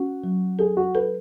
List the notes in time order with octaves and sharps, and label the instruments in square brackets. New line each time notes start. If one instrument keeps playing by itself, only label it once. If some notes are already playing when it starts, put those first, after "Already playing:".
Already playing: [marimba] C#4 [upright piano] F#4
[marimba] F#3
[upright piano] G#4 [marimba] A4
[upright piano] F#4
[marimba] A4 [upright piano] B4